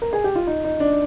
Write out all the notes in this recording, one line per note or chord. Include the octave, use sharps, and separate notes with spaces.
A#4
G#4
G4
F4
D#4
D#4
D4